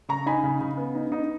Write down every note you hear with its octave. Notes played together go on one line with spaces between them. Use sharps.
C#3 A#5 C#6
D#4 G#5 B5
C#3
C#3
B3
D#4
D#4